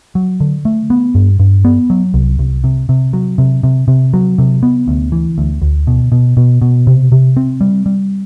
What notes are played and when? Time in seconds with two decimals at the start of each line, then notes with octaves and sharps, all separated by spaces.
0.15 F#3
0.40 D3
0.65 A3
0.90 B3
1.15 G2
1.39 G2
1.65 B3
1.90 F#3
2.14 C2
2.39 C2
2.64 C3
2.89 C3
3.13 F#3
3.38 C3
3.63 C3
3.88 C3
4.14 F#3
4.38 C3
4.63 B3
4.88 D2
5.12 E3
5.38 D2
5.62 D2
5.87 B2
6.12 B2
6.37 B2
6.62 B2
6.87 C3
7.12 C3
7.37 C4
7.61 G3
7.86 G3